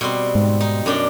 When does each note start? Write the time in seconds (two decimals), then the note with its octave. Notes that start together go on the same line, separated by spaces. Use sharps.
0.01 B2 G3 C4
0.35 G#2
0.61 D#4
0.86 F#2 D4 G5